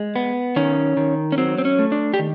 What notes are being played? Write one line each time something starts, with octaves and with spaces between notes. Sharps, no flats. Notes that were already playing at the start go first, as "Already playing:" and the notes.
Already playing: G#3
B3
D#3 C#4
D#3
C#4
F#3 C4
C4
C#4
A3
D4
G4
D#3